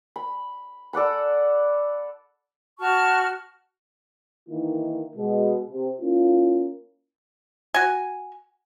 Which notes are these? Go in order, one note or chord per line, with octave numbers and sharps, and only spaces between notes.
B5
A4 D5 F#5 B5
F#4 A5 C#6 F6
D#3 E3 A#3 D#4 E4
B2 G#3
C3
A#3 C#4 E4 F4
F#4 G#5